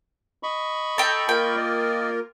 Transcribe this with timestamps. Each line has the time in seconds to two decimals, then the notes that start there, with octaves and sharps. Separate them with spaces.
0.43 D#5 B5 C#6
0.98 A4 G5 A5 A#5
1.29 A#3 F4 A#4 G5
1.56 D5 D#5